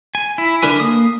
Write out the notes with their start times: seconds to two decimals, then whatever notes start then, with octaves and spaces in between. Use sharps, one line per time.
0.15 G#5
0.38 E4
0.62 D3 D4 A#4 B4 G#5
0.80 A#3 D#6